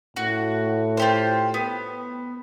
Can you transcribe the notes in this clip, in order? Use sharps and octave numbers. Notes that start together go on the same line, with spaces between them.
A2 F#4
F4 G4 C5
B3